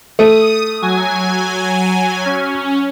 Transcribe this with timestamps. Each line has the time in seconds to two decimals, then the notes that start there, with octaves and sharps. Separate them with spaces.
0.19 A3 D#6
0.82 F#3 G#5
2.25 C#4